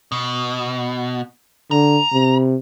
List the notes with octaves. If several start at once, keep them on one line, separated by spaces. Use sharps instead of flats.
B2
D3 A#5
C3